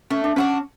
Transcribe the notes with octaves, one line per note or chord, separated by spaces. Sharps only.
A3 C#4
D4
C#4 D4 F#4 B4